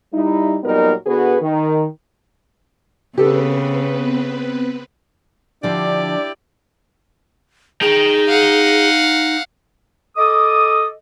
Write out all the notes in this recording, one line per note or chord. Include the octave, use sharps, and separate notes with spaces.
G3 D#4 E4
A#2 F#3 G3 B3 D#4 A#4
D3 B3 F#4 G#4 B4
D#3
C#3 B3 C4 G4 A4 B4
D3 F3 D4 E4 G4 D5 G5
D#4 G#4 G5
F5 F#5
A4 D#5 D6 D#6